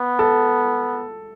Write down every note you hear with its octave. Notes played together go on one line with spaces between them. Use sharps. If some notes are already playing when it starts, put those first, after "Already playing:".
Already playing: B3
A4